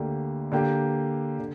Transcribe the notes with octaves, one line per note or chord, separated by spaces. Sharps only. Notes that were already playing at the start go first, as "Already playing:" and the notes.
Already playing: D2 D3 A#3 G4
D3 A#3 G4
D3